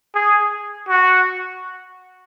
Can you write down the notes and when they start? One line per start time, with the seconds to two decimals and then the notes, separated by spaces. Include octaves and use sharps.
0.15 G#4
0.89 F#4